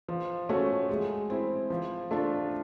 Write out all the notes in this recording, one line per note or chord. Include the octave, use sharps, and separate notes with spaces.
F3
A3 C#4 F#4
G#3
C4 E4
F3
A3 D4 F4